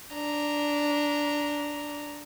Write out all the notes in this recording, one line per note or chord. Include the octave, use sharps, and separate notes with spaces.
D4 A#5